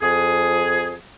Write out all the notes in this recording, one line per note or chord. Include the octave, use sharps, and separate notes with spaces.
F2 G#4